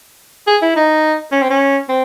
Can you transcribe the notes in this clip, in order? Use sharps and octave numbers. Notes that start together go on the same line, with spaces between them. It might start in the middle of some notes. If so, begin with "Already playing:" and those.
G#4
E4
D#4
C#4
C4
C#4
C4